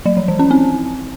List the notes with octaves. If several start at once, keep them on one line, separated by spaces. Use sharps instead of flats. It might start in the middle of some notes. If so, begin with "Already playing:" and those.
F#3
F3
E3
C#4
C4